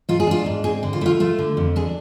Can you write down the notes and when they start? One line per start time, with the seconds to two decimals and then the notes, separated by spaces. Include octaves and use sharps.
0.09 G#2 F4
0.20 G#4
0.27 D4 F4
0.46 G#2
0.64 C4 G#4
0.83 D3
0.93 F4
1.01 A3 E4
1.06 F4
1.20 A3 F4
1.39 D3
1.57 F2
1.76 D4 G#4